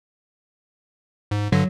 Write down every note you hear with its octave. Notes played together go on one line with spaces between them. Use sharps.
G#2
G2 D3 F#3